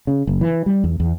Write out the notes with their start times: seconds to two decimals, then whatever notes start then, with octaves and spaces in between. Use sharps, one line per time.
0.07 C#3
0.27 F#1
0.41 E3
0.66 G3
0.84 E2
1.00 E2